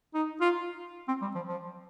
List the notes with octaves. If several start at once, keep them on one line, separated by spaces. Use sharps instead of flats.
D#4
F4
C4
G3
F3
F3